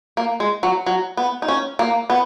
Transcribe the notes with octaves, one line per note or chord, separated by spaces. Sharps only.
A#3
G#3
F#3
F#3
B3
D#4
C#4
A#3
B3